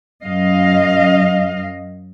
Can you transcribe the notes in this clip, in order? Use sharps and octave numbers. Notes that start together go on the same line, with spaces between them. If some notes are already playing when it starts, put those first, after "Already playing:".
F#2 D#5 F5